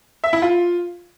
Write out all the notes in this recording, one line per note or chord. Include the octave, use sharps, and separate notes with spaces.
E5
E4
F4